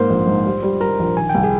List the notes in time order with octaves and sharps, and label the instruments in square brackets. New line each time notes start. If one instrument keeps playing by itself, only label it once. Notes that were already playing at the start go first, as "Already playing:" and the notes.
Already playing: [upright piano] G#2 A#3 [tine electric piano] C5 C6
[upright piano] A#1
G#2
G3
G3
[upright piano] G3 [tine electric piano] A#4 A#5
[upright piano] A#1
[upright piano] D#3 [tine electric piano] G#5
[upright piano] C2 [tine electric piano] G5
[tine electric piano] G#4 G#5